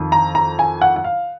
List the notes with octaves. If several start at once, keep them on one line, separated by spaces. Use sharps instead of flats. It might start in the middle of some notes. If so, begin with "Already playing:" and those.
Already playing: F2 D#3
A#5
A#5
G#5
F#5
F#5
F5